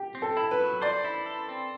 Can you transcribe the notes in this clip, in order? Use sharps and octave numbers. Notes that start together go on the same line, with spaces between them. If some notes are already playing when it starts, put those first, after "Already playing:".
Already playing: G4
C4
A4
E4
B4
F#3
C5 D5
E4
A4
C4